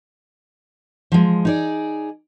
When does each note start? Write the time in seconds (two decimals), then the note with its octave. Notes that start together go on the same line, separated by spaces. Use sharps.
1.12 F3 G#3
1.45 D#4 G#4 D5